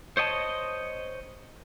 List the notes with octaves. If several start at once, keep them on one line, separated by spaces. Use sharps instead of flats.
C5 C#5 D#5 G#5 A5